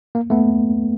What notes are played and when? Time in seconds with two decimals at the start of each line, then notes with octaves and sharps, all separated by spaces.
0.15 A#3
0.30 A3 B3